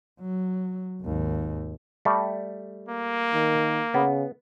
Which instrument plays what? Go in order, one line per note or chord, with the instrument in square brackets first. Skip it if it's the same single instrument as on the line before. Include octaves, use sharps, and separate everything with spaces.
[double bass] F#3
G#1 D#2
[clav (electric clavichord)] G3 A3
[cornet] A#3
[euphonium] D#3
[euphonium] C#3 [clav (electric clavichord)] B3